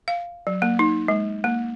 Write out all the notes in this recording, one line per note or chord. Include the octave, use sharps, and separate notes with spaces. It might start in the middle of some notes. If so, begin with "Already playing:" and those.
F5
F#3
A#3
D#4
G#3
A#3